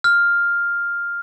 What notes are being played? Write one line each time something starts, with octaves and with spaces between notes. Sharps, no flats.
F6